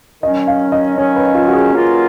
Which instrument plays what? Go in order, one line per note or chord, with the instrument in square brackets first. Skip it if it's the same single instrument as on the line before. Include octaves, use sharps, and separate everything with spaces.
[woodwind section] D#3 F#3 C#4 [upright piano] D#5
[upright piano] F5
D#5
[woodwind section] D#3 F#3 C#4 [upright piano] C#5
[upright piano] B4
F4
F#4
G#4
[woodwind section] F#3 A#3 C#4 F4 A#4